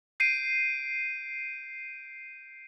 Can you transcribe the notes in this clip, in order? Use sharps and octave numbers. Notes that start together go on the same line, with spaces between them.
G6 C7 D7 D#7